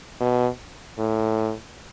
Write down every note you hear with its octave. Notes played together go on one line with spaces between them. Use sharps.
B2
A2